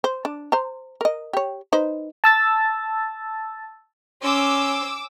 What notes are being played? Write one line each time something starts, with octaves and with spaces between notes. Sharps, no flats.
C5
D4
C5 A#5
A#4 D#5
G4 C#5
D#4 B4 C5
A5 E6 A6
C#4 C6 D6 E6